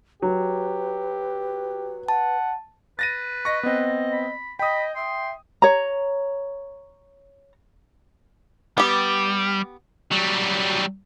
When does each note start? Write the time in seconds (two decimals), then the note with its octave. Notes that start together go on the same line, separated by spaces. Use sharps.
0.22 F#3 G4 B4
2.08 F#5 A5
2.99 B4 A6 A#6 D#7
3.45 D#5 C#6 A#6
3.63 B3 C4 D#5
4.12 B5
4.59 D#5 G5 B5 D#6
4.96 E5 C6
5.62 C#5 A#5
8.78 G3 B3 G4
10.11 F#3 G3